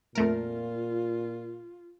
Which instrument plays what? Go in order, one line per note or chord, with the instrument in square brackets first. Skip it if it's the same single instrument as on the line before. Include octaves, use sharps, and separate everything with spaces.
[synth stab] F2 A3 A#4 [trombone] A#2 [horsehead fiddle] F4